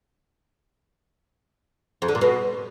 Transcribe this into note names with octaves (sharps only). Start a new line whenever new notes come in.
F2
D3
A#2
B2